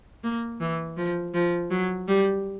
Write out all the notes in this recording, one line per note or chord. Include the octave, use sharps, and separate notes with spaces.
A#3
E3
F3
F3
F#3
G3